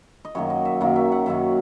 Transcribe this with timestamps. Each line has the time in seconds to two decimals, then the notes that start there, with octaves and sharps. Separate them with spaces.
0.25 D#5
0.35 F#2 D#3 F#3 A#3 C#5
0.50 D#5
0.65 E5
0.81 F#2 D#3 F#3 A#3 E5
0.96 E5
1.12 F#5
1.26 F#2 D#3 F#3 A#3 E5